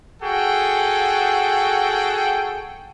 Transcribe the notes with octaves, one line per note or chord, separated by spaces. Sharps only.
F#4 G#4 A4 F#5 G5